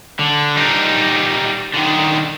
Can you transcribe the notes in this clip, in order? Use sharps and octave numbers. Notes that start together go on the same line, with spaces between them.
D3
G3 D#4
D3 D#3